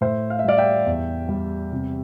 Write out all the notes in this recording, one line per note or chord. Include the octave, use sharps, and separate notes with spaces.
A2 C5 E5
F5
E5
G3 D5 F5
E5 G5
E2
G3
C3